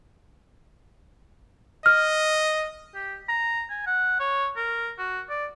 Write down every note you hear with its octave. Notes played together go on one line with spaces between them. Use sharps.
D#5 F6
G4
A#5
G#5
F#5
C#5
A#4
F#4
D5